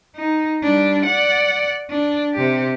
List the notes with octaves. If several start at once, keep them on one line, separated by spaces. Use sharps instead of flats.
D#4
G3 D4
D5 F#5
D4
C3 G4